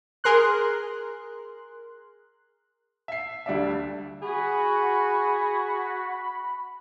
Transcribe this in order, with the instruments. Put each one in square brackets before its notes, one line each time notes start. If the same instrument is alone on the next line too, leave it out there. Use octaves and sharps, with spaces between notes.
[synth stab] G#4 A#4 C6 F#6
[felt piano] E5 C7
D2 G3 D4 D5 E5
[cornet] F#4 [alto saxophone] G#4 [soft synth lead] B5